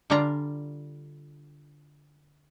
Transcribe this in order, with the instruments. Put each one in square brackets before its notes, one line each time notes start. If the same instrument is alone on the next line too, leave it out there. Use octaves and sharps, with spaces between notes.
[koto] D3 G3 D4 F4 A#5